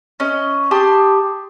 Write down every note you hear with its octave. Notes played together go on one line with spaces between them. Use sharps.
C#4 D#5
G4 A5 C6 D#6